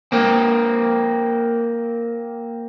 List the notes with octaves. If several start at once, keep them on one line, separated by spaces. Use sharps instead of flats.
A#3 C4